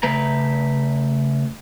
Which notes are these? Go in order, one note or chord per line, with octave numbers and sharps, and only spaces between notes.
C#3 A3 B4 A#5